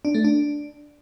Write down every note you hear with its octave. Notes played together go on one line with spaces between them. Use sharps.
D4
A3
D4